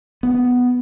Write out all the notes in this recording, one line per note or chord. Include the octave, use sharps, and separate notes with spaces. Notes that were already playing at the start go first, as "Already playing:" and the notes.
B3